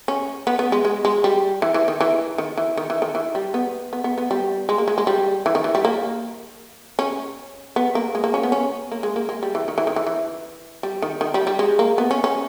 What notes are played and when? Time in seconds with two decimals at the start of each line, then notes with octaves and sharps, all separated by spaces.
0.08 C#4
0.47 B3
0.59 B3
0.72 G#3
0.85 G#3
1.05 G#3
1.24 G3
1.62 E3
1.74 E3
1.88 D#3
2.01 E3
2.38 D#3
2.57 E3
2.77 D#3
2.90 E3
3.02 D#3
3.15 E3
3.35 G3
3.54 B3
3.93 B3
4.04 B3
4.18 B3
4.31 G3
4.69 G#3
4.78 A#3
4.88 G#3
4.98 G#3
5.07 G3
5.46 E3
5.55 D#3
5.64 E3
5.75 G3
5.85 A#3
6.99 C#4
7.76 B3
7.95 A#3
8.15 G#3
8.24 A#3
8.34 C#4
8.43 B3
8.52 C#4
8.91 A#3
9.03 G#3
9.16 A#3
9.29 G#3
9.43 G3
9.55 E3
9.68 D#3
9.78 E3
9.87 D#3
9.96 E3
10.07 E3
10.83 G3
11.02 D#3
11.21 D#3
11.34 G3
11.47 G3
11.59 G#3
11.79 A#3
11.98 B3
12.11 C#4
12.24 C#4